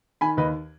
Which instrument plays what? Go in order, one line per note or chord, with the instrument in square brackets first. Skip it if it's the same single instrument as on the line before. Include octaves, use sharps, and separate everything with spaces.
[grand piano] D#3 G#5 B5
D#2 B4 D#5